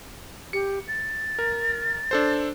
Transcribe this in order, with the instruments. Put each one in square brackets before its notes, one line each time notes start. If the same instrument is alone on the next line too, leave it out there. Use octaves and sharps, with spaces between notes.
[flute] G4 [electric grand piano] C#7
[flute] A6
[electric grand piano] A#4
D4 A4 C5